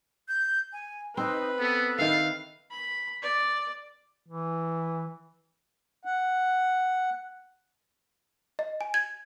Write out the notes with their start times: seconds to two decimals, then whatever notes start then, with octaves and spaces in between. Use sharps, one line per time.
0.28 G6
0.73 G#5
1.17 C4 D#4 B4
1.59 B3 A4
1.98 D#3 E5 F5
2.71 B5
3.22 D5
4.28 E3
6.05 F#5
8.59 D#5
8.81 G#5
8.94 G#6